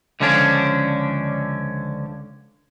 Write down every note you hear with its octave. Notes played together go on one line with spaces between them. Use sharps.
C#2 D3 F3 C#4 D4